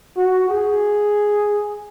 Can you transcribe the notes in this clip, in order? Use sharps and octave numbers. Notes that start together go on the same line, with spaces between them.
F#4
G#4